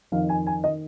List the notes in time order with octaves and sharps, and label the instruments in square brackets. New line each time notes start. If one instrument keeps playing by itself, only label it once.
[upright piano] F2 D#3 F5
G#5
G#5
D#3 D#5